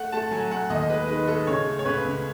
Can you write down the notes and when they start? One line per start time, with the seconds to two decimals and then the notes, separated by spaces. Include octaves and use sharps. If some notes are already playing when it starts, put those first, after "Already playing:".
Already playing: A3 F#5
0.12 A3 A5
0.31 F#3 G#5
0.51 A3 F#5
0.70 D#2 D#5
0.89 G#3 B4
1.08 D#3 B4
1.28 G#3 A4
1.47 C#3 C#5
1.66 A3
1.79 C#5
1.85 C#2 B4
2.04 C#2